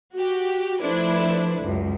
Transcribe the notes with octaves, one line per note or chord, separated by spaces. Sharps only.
F#4 G4
F3 A3 D4 E4 B4 C5
C#2 F#2